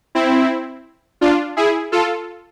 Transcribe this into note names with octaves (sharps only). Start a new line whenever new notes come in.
C4 E4
D4 F4
E4 G#4
F4 A4